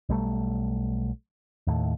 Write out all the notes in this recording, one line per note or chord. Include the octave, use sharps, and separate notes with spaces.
B1 G3 A3
D#2 A2